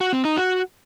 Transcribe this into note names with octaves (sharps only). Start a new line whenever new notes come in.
F#4
C4
D#4
F#4